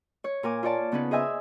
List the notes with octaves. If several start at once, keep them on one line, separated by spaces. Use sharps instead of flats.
C#5
A#2 A#4 G#5 D6
F4 C#5 D5 A5
C#3 B3 C#4 D#4 B4
G#4 C5 D#5 E5 G#5